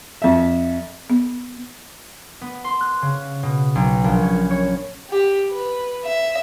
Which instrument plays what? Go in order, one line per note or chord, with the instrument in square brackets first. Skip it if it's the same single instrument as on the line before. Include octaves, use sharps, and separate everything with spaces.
[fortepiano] F2 E5
[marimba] B3
[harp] B3
C6
F#6
C#3
B2
B1
A#1
C#4
C#5
[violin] G4
B4
E5